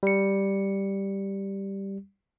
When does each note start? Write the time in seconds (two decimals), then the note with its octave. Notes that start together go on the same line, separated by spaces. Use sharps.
0.03 G3 C#7